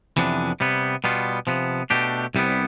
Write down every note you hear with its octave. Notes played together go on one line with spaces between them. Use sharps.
F2 C3 E3 B3 D4
C3 G3 B3
B2 G3 B3 F4
C3 F3 B3
B2 A3 D4 G4
C2 C3 G3 B3